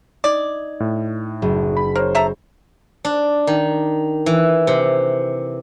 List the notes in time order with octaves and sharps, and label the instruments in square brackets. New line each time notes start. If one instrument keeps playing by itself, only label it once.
[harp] D#4 G#6 [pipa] D5
[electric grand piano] A2
[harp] F#1
[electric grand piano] B5
[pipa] A#4 [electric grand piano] C5 C#5
[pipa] A4 E5 A#5
[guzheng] D4
D#3
E3
C3